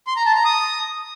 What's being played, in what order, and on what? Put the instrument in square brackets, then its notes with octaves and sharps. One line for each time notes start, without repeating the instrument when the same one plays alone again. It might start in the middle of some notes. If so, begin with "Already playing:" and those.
[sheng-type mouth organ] C6
A#5
A5
A#5
D#6